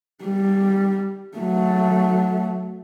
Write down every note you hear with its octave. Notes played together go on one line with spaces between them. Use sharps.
G3
F#3 A3